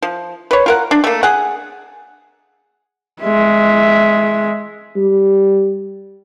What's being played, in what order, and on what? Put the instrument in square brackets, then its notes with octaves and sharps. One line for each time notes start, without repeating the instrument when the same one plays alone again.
[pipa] F3
B4 C#5
F4 A#4 F#5
D4
A3 A#3
G#4 F#5
[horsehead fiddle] G#3 E5
[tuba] G3